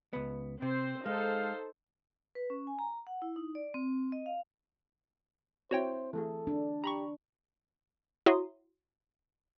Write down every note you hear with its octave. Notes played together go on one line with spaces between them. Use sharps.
C#2 B3
C3 C4 C5
G#3 D#4 A4 C5 F5
B4
C#4
G#5
A#5
F#5
E4
D#4
D5
C4
D#5
F5
C4 E4 F#4 C5 C#5 G5
E3 A3 G#4 A4
D4
G4 A#5 B5 C#6
E4 F#4 C#5 A#5 C6 D#6